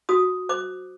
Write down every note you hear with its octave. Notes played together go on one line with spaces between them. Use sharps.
F#4 D#6
C5 D6